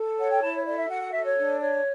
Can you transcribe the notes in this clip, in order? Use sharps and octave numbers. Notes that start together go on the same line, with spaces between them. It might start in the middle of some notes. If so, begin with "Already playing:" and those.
Already playing: A4
C#5 F#5
G5
E4 A5
C#5
A4 D5
E5
F#4 F#5
F#5
A4 E5
C#5
D4
C#5